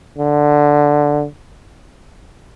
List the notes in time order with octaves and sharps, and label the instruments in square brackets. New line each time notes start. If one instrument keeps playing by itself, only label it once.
[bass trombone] D3